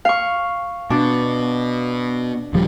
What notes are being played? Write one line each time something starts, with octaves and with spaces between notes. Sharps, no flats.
F5 C#6
B2 D4
D#1 F3 G3